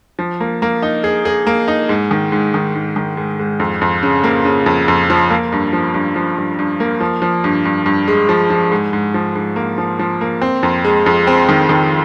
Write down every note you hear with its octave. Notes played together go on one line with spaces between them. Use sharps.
F3
A#3
A#3
D#4
G#4
G#4
A#3
D#4
G#2
D#3
G#2
D#3
G#2
D#3
G#2
G#2
F2
F2
C#3
A#3
C#3
F2
F2
F3
A#3
G2
F3
G2
F3
G2
G2
A#3
F3
F3
G2
G2
G2
G#3
F3
F3
G#2
G#2
F3
G#2
A#3
F3
F3
A#3
C4
F2
G#3
F2
C4
D#3
D#3